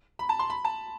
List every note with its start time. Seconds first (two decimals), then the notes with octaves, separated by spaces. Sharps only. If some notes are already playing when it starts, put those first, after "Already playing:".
0.19 B5
0.29 A5
0.39 C6
0.50 B5
0.65 A5